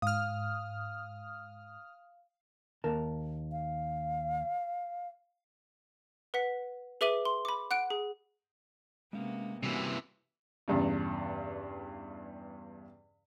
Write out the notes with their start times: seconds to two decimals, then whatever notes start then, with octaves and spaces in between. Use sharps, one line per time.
0.02 G#2 F5 D#6 F6
2.84 D#2 A#4 A5
3.52 F5
6.34 B4 F#5 B6
7.01 G#4 B4 E5 D6 D#7 F#7
7.25 C6
7.45 B5 D6
7.71 F#5 F#6 D7
7.90 G#4
9.13 C3 G#3 A#3 B3 C#4 F5
9.63 C3 E3 G3 A#3 B3 C#4 F#4
10.68 E2 G2 C#3